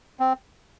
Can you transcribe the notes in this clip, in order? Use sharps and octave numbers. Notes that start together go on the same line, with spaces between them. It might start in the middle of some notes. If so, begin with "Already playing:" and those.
C4